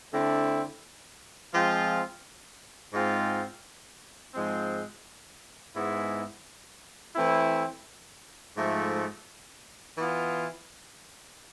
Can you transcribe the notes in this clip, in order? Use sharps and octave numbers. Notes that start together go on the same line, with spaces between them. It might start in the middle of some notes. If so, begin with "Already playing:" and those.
D3 A3 C4 E4
F3 G#3 C4 F4
G#2 G#3 C4 F4
G#2 F3 G#3 C4
G#2 G#3 B3 E4
E3 A3 C4 E4
G#2 F3 A3
E3 B3 F4